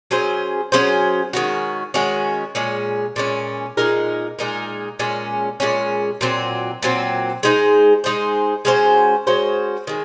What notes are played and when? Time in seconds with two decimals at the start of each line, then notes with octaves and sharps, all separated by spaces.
0.11 F#3 C#4 G#4 C5
0.72 F#3 C#4 G#4 C5
1.33 D#3 G#3 C#4 F#4
1.94 D#3 G#3 C#4 F#4
2.55 A#2 G#3 C#4
3.16 A#2 G#3 C#4
3.77 A#2 G#3 D#4 A#4
4.39 A#2 G#3 D#4 A#4
4.99 A#2 G#3 C#4
5.60 A#2 G#3 C#4
6.21 A#2 F#3 C4
6.83 A#2 F#3 C4
7.43 G#3 D#4 G#4 C5
8.04 G#3 D#4 G#4 C5
8.65 G#3 C#4 F#4 C5
9.27 G#3 C#4 F#4 C5
9.87 D#3 G#3